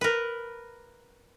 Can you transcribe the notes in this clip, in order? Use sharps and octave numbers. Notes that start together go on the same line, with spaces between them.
A#4 B4